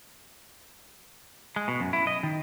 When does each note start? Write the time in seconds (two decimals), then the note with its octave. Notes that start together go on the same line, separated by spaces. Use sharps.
1.56 G#3
1.68 B2
1.80 F#2
1.93 E4
2.07 D#5
2.23 D#3